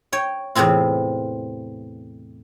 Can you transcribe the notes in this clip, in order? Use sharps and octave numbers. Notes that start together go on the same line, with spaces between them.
C#5 G5
E2 A2 C3 C4 F4